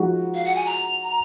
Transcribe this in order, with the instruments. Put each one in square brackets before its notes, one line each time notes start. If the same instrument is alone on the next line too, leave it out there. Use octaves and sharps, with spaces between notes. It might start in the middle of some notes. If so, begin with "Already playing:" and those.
Already playing: [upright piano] F3 G#3 D#4 F#4
[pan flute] F5
F#5
G#5
A#5